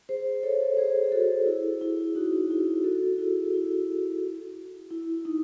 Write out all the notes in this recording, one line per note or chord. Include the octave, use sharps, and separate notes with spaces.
G#4 C5
A4 C#5
G#4 C5
G#4
F#4 A4
E4 G#4
E4
D#4 F#4
E4 G#4
F#4 A4
E4 G#4
E4
E4
D#4